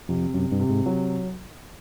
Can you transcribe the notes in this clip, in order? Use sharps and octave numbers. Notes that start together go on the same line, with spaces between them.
F2 C3
F#2 C3
G2
C3
G#2
F#3